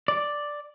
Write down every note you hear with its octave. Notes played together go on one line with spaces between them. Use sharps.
D5